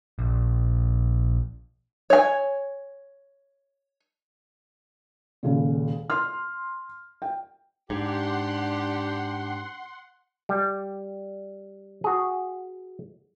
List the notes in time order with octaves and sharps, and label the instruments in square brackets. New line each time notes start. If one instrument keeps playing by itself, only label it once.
[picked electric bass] A#1
[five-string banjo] C#5 G#5
[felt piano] D#1 C#2 A#2
C6 F6
G5
[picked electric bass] G#2 [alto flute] D4 [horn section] G4 [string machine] F#5 C6
[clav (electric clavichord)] G3
F#4 G#4